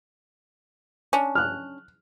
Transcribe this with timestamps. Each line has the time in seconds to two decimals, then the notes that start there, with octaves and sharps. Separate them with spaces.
1.13 C#4 D4
1.35 F6 F#6